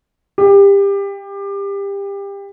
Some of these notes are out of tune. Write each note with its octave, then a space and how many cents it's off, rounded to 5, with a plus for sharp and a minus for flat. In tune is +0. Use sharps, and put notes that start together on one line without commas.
G4 +25